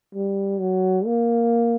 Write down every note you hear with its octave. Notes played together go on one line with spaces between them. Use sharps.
G3
F#3
A#3